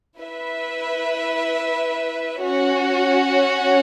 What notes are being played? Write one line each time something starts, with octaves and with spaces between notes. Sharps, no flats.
E4 B4 E5
C#4 F#4 C#5